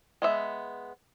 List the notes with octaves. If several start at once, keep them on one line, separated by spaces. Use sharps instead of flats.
G#3 B3 E5